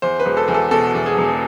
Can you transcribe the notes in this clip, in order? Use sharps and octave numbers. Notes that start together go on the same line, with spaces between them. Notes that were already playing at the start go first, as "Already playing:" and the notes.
E2 C5
B4
E1
A4
E2
A4
B2 A4
E2
G#4
E1